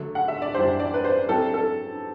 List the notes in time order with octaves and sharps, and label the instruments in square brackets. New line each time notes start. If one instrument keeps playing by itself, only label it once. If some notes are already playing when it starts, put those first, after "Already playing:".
Already playing: [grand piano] D3 F#3 A3
[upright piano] F#5
E5
D5
[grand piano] F#2 E3 G3 D4 [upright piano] C5
[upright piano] D5
B4
C5
[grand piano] F#3 C4 E4 G4 [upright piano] A4
[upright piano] A4